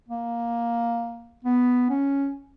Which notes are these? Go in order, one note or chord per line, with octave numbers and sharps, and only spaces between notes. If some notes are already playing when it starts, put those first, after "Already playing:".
A#3
B3
C#4